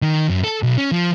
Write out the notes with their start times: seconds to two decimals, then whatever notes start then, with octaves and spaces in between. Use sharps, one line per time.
0.02 D#3
0.29 F#2
0.44 A4
0.63 B1
0.78 C#4
0.92 F3